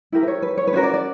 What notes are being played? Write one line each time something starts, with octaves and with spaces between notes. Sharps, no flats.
E4 G4 A#4 E5
B4
C#5
B4
C#5
B4
C#4 F#4 A#4 C#5
D5
D5